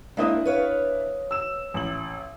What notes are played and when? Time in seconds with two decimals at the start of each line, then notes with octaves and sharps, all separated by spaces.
0.17 G#3 A#3 C4 D4 E4 D#6
0.45 B4 C#5 F5
1.31 E6 E7
1.74 A1 F#7